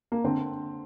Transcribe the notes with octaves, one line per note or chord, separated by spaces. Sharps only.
A#3
D3 C4